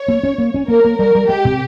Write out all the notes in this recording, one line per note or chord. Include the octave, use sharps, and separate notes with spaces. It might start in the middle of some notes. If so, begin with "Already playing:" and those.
Already playing: C#5
A#3
C#4
A#3
C#4
A#3 A#4
A#3
G3 A#4
G3
G#3 G4
C3